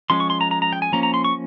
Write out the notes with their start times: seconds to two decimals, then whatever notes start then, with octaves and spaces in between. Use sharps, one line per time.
0.10 F3 G#3 C#4 C6
0.20 C#6
0.30 C6
0.41 A#5
0.51 A#5
0.62 A#5
0.73 G5
0.82 G#5
0.92 F3 A#3 C#4 A#5
1.03 A#5
1.14 C6
1.24 C#6